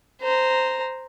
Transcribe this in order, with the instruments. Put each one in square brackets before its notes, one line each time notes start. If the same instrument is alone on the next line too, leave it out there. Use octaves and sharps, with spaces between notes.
[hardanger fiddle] C5 A#5